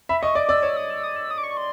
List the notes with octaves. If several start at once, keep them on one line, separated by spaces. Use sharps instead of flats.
E5 B5
D#5 C#6
D5 D6
D5 E6
C#5 E6
D#6
E6
D#6
E6
D#6
D6
C#6
C6